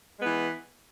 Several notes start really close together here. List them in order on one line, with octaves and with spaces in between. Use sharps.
G#3 B3 E3